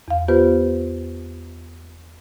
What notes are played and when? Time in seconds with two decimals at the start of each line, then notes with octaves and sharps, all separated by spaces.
0.08 E2 F5
0.28 B3 F4 G4 B4 C5